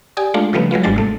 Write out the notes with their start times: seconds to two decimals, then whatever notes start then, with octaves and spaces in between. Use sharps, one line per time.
0.17 G4 D5 G#5 D#6
0.34 G#3 A3 D4 F4
0.53 C#3 F3 G3 A3 B3
0.71 F#3 G#3 B3 F4
0.83 G1 G#2 G3 G#3 D4 A6
0.96 C3 A3